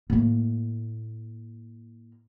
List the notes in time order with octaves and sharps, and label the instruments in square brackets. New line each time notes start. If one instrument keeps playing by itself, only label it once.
[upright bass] A2 A#3